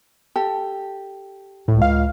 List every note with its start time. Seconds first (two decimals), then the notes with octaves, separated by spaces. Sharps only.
0.36 G4 A4 A5
1.68 C#2 A2
1.82 F5